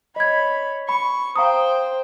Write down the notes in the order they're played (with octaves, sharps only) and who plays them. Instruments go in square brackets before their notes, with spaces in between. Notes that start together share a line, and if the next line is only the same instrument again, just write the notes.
[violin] C#5 B5 [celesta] D#5 G#6
[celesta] B5 [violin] C#6
[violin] C5 G5 [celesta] F5 A#5 D#6